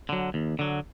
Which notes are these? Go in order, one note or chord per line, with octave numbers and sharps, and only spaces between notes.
D3 F#3
D#2
D3 F#3